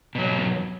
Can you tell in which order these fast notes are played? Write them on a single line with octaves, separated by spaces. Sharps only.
B2 F#3 E2